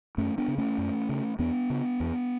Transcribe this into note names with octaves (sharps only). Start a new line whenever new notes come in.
F#2 A3 C#4
B3 D4
C#3
A3 C#4
F#2
C#3
E2 B3 D4
C#3
E2